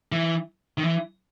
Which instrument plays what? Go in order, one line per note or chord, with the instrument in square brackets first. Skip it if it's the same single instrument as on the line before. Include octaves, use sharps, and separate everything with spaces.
[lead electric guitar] E3
D#3
E3